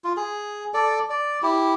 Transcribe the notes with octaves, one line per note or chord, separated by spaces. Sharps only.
F4
G#4
A4 D5
D5
E4 G4